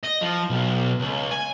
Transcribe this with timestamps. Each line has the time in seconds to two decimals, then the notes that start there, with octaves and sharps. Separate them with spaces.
0.03 D#5
0.21 F3
0.50 B1
1.00 C#2
1.31 G#5